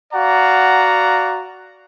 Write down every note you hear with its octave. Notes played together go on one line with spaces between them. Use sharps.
F#4 D5 F5 F#5 A#5